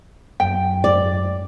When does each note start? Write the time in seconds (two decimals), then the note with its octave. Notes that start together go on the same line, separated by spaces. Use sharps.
0.40 F#2 G5
0.84 D5